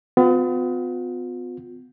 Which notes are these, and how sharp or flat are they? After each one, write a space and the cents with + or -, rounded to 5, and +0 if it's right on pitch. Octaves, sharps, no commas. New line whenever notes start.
B3 +40 F4 +40